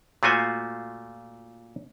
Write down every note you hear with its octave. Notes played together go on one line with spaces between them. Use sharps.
A#2 A3 F4 F#4 C5 G#5